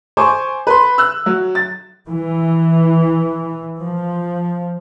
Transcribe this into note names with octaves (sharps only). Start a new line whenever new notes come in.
C5 G#5 C#6 D6
B4 C6
E6 F#6
F#3
A6
E3
F3